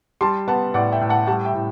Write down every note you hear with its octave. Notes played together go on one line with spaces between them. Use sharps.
G3 A5 C6
B3 F#5 A5
A2 D5 F#5
E5 G5
A2
F#5 A5
G3 F#5 A5
E5 G5
A2